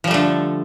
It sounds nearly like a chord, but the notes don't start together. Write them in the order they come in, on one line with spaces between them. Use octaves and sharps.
F3 G3 A3 D3